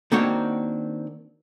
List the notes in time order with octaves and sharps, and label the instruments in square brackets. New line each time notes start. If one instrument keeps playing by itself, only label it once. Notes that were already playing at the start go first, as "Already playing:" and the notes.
[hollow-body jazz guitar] D#3 A#3 C4 D4 F#4 C#5